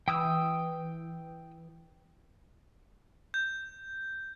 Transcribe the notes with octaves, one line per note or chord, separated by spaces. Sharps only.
E3 G5 D#6 E6
G6